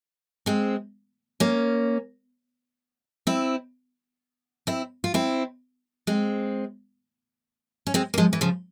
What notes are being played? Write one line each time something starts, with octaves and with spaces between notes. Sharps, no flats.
G#3 C4
A#3 C#4
C4 E4
C4 E4
F4
C4 E4
G#3 C4
C#4
G#3 C4
A#3
F3 G#3
E3
C#3 F3